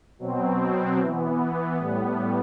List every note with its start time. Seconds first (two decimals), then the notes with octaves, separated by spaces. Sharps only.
0.19 B2 F#3 C4
0.98 E3 B3
1.77 A2 G3 B3